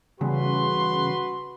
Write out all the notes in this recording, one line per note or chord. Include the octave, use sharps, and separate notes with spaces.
E2 G2 C#3 F#4 B4 C6